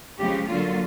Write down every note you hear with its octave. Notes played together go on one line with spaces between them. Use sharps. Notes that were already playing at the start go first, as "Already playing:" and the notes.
C#3 F3 G#3 G4
D3 F#3 A#3 F4